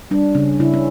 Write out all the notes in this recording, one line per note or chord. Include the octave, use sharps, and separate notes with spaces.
G3 D4
C#3 C#4
C#3 E4
C#4